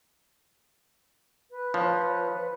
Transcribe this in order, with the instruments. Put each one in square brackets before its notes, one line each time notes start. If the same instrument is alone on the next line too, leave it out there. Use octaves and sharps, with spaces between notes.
[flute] B4
[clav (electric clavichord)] F3 [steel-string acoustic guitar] C#5